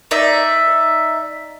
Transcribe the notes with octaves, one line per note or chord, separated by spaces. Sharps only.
D#4 D5 E5